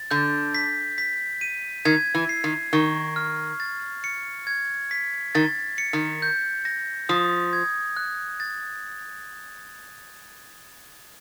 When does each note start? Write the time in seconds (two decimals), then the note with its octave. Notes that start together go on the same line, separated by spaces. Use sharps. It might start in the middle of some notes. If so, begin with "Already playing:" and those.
Already playing: A6
0.11 D3 G6
0.55 B6
0.98 B6
1.41 D#7
1.85 D#3 G#6
2.15 E3
2.29 C7
2.44 D#3
2.73 D#3 C#6
3.16 F6
3.60 A6
4.04 C#7
4.47 G#6
4.91 B6
5.35 D#3 A6
5.78 C#7
5.93 D#3
6.22 G6
6.65 A#6
7.09 F3 D#6
7.53 G#6
7.97 F#6
8.40 A6